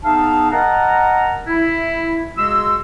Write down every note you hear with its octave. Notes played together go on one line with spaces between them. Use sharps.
B3 D#4 G#4 E5 F5 A5
A#4 D#5 F#5 A5 A#5
E4
C#3 G#3 F#4 C6 E6